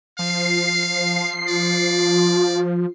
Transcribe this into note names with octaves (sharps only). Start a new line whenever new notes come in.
F3 F5 C7
F4 D5